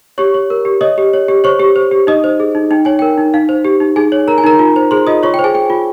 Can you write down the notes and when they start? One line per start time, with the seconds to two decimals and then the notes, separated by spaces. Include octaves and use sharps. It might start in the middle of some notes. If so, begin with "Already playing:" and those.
0.18 G4 C#5 C#6
0.34 C#5
0.50 A#4
0.65 G4
0.81 C#5 D#5 D#6
0.98 G4
1.13 C#5
1.28 G4
1.44 C5 C#5 C#6
1.60 G4
1.76 C5
1.91 G4
2.07 D#4 D#5 D#6
2.24 C5
2.40 G#4
2.55 D#4
2.71 D#4 G5
2.85 C#5 G#5
2.99 A#4 G5
3.18 D#4
3.34 D#4 F5
3.49 C5
3.65 G4
3.80 D#4
3.96 D#4 G#4 G#5
4.12 C#5
4.28 A#4 A#5
4.38 G#5
4.44 D#4 A#4 A#5
4.59 F4
4.76 C5
4.91 G#4 C5 C6
5.07 F4 D#5 D#6
5.23 F4 C#5 C#6
5.34 G5
5.39 C5
5.44 G#4 G#5
5.54 G#4 G5
5.70 F4